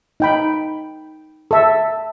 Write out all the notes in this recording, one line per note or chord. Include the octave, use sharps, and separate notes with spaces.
D#4 G5 B5
A4 E5